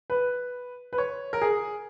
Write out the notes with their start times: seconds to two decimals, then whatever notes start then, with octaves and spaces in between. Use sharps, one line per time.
0.10 B4
0.93 B4
0.98 C#5
1.33 A#4
1.41 G#4